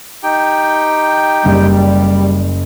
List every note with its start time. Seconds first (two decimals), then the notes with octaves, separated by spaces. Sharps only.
0.23 D#4 G4 G5
1.45 F#1 G3